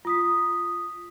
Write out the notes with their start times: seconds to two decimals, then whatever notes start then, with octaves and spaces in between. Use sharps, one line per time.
0.05 F4 D#6 B6